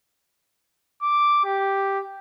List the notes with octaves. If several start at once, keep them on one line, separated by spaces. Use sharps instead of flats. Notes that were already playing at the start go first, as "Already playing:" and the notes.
D6
G4